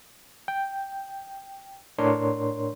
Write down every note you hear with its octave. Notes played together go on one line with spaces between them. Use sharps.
G5
A2 D4 A#4 C#5 C6